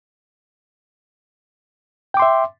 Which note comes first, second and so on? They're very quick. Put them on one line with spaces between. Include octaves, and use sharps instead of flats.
G5 D6 C6 E5